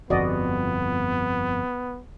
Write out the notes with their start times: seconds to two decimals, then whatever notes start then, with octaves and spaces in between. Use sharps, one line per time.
0.10 G1 F2 B3 F#4 D5 D#5